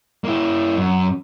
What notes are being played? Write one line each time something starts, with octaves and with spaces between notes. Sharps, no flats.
A#3 E4
F#2